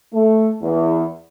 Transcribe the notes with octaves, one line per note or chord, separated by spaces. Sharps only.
A3
E2